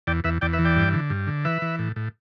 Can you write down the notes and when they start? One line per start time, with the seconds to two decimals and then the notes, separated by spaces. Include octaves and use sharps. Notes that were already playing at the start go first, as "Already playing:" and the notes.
0.07 E2 D5 G5
0.24 E2 B4 E5
0.41 E2 D5 G5
0.53 B4 E5
0.59 E3
0.65 D5 G5
0.76 G2
0.93 D3
1.10 G2
1.27 D3
1.45 E3 B4 E5
1.62 E3
1.79 A2
1.96 A2